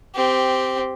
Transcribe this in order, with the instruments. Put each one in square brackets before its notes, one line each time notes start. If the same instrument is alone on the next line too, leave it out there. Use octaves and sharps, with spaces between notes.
[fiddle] C4 G4